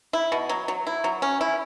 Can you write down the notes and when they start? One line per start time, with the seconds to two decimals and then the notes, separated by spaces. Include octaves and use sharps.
0.13 E4
0.32 B2
0.49 F#3
0.68 F#3
0.87 E4
1.04 F#3
1.22 C#4
1.41 E4